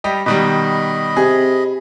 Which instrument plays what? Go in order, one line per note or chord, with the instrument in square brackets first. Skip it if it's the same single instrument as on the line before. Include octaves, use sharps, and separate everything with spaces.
[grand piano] G3 G4 D#5
[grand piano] B2 D#3 G3 [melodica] D#5 B5
[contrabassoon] C3 [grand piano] G#4